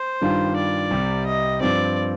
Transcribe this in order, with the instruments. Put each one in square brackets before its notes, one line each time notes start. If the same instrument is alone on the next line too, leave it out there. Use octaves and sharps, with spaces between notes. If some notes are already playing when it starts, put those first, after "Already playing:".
Already playing: [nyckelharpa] C5
[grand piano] G2 D#3 G3 D4 F4
[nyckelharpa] D5
[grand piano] C2 C3 G3
[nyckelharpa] D#5
[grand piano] G2 F3 C4 [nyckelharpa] D5